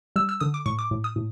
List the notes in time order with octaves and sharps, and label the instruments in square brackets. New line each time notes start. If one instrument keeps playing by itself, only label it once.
[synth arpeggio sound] G3 E6
E6
D3 D#6
D6
A2 C#6
D6
A2
D#6
A2